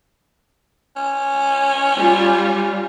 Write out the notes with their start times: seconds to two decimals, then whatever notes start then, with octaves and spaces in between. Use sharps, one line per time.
0.96 C#4
1.97 G3 F4